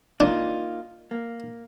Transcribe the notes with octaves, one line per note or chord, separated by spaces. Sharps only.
A#3 D4 D#4 F4
A#3